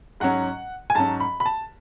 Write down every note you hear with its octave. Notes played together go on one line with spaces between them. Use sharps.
G#2 F#3 C#4 F#5
G#5
G#2 F#3 C#4 A5
B5
B5
A5